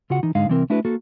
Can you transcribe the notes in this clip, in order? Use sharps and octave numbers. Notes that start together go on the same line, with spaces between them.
C#3 F4 F#4 F#5
E3 D#4
G#2 D3 G#3 D#4 F5
C2 E3 C4 A#4
A3 D4 E4 F#4 B4
A#3 F#4 A4